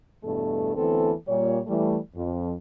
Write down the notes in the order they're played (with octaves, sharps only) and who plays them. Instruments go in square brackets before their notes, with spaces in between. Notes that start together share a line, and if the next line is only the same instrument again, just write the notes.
[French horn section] E2 G2 B2 A3 A4
D2 E3 B3 C4 A4
A#2 G3 C#5
E3 G3 A3
F2